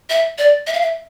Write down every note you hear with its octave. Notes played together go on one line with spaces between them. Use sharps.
E5
D5
E5
F5
E5